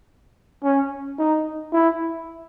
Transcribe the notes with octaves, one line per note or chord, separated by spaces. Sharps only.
C#4
D#4
E4